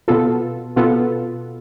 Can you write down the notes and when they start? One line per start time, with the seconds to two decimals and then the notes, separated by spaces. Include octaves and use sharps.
0.08 B2 B3 F4 A4
0.76 B2 B3 F4 A4